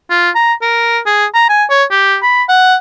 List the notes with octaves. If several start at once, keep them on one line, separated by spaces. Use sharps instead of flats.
F4
A#5
A#4
G#4
A#5
G#5
C#5
G4
B5
F#5